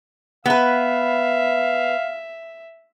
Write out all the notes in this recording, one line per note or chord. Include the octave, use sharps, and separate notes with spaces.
B3 B4 E5 F5